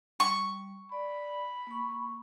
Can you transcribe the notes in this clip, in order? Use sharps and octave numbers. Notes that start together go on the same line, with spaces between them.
G3 C#6
D5 B5
A#3 C#6